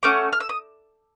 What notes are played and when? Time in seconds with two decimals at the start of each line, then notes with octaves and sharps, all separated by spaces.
0.03 A3 C#4 F#4 D6
0.33 F6
0.40 E6
0.49 D#6